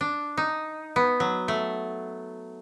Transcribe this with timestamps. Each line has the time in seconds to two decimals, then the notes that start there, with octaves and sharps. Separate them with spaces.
0.01 D4
0.37 D#4
0.96 B3
1.20 F#3
1.48 A3